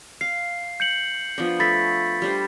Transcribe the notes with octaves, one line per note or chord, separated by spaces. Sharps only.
F5 C7
G6 C#7 F#7
F3 B3 D4
A3 B5 A6 B6
G3 D4 C5